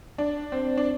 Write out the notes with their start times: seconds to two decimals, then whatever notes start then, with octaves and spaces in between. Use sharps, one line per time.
0.18 D4
0.52 C4
0.77 D4